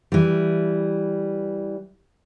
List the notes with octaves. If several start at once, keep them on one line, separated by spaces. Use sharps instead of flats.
E3 G3